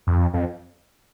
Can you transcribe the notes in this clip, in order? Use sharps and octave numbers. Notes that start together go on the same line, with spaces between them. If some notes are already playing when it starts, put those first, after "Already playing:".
F2
F2